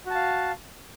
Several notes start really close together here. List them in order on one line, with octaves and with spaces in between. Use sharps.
F#4 A5 F5